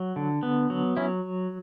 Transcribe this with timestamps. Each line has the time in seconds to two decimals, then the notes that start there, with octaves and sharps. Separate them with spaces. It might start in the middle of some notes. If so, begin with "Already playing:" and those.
Already playing: F#3
0.16 D3
0.43 B3
0.70 F#3
0.97 F#3 C#4 E4